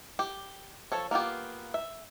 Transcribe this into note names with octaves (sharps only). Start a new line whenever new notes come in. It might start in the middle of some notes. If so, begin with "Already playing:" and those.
G4
F3 A4 C#5
A#3 B3 F4 G4
E5